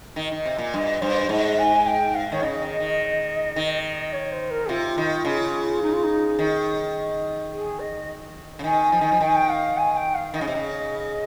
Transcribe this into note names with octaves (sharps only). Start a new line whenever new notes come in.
D#3
D#3
C3
A#2
G2 D#5
G2 C5
G#2 D#5
G#5
G5
F5
D#3 C#5
C#3 D#5
D#3
D#3
D#3
C#5
C5
A#4
C3 F4
D#3
C#3
D#4
F4
D#4
D#3
G#4
D#5
C#3
D#3 G#5
F3
D#3
F3
D#3 G5
G#5
G5
F5
G#5
G5
F5
D#3 D#5
C#3
C3
C#3